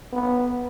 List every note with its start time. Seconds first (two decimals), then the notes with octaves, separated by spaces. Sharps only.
0.13 B3